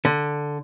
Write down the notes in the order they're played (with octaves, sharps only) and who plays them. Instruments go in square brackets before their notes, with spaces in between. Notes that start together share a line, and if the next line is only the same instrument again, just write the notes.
[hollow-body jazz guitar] D3